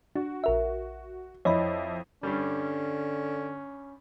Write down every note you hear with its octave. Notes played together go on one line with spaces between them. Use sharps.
D4 F#4
A#1 A#4 E5
F2 E4 C#5 D#5 B5
G2 D3 G3 C#4